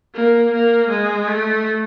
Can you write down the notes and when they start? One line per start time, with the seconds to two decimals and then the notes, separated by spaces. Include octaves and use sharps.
0.14 A#3
0.52 A#3
0.90 G#3
1.27 A3